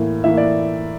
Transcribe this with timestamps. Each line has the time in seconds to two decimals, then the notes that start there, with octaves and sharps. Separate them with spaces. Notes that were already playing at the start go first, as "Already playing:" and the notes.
Already playing: A2 E3 A#3
0.24 A2 E3 A#3 E5
0.37 D5